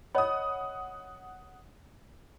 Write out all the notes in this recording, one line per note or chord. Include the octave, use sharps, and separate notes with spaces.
C#5 D#5 F#5 B5 D#6